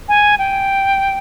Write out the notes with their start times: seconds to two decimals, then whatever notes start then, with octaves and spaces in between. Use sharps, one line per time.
0.08 G#5
0.39 G5